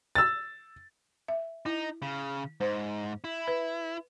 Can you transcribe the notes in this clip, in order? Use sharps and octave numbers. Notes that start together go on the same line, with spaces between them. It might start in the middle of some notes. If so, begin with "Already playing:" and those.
E6 A6
E5
D#4 E4
C#3
G#2 C5
E4
B4